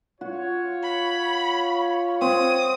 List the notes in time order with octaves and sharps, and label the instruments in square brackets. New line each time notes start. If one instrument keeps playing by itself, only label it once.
[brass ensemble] F4 C#5 [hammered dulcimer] F#4
[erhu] B5
[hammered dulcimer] C4 [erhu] D#6